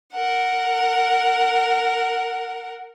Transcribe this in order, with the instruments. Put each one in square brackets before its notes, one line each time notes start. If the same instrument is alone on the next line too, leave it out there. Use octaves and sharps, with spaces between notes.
[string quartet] A#4 F#5